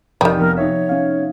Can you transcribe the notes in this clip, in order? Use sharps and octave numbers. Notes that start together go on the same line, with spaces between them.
F1 D#3 G3 D#6 C7
F3 B3 A#4
D#4 C#5 E5
C#4 F5